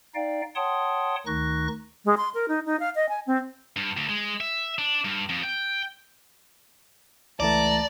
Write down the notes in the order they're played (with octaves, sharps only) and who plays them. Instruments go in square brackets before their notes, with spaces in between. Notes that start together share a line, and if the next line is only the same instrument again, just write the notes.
[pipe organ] D#4 D5 F5 G5
C#5 F#5 G5 A5 C6 D#6
D2 D#3 D#4 C#6 F#6 A#6
[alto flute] G#3
C6
A#4
D#4
D#4
F5
D#5
G#5
C4
[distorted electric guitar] G2
D2
G#3
E5
D4
G2
F2
G5
[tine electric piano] C#2 E3 A3 [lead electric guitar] D5 [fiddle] A5 A#5